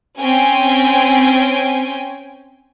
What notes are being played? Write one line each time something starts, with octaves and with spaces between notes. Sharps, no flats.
C4 C#4 G5 G#5